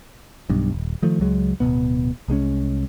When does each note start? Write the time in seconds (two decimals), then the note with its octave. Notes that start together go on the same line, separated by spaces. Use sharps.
0.50 B1 G2
0.72 D#1
1.02 D#3 F3 A3
1.20 C#2 F#3 G#3
1.60 D1 C2 B2 B3
2.28 C2 G#3 C4 C#4